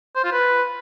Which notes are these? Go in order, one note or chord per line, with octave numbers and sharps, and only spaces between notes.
C5
F4
B4